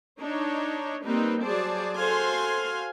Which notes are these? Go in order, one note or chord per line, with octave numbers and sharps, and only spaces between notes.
D4 D#4 C#5
G3 A#3 C4 D#4 B4
F#3 G#4 C5 D5 A5
F#4 A4 C5 F5 G#5 C6